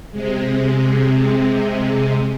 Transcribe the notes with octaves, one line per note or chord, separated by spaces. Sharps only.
C3 G#3